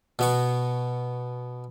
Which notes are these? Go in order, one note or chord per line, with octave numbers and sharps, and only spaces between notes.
B2 B3 C#6